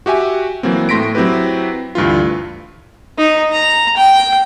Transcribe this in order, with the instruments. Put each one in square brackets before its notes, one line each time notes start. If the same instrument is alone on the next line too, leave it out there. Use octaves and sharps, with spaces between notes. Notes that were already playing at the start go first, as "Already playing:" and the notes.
[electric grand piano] F#4 G4 E5 G#5
E3 F#3 A#3 C4
A2 A3 C6 A#6 B6 D7
F#3 C4 E4 G4 B4
D2 G2 E3 F4
[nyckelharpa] D#4
A#5
G5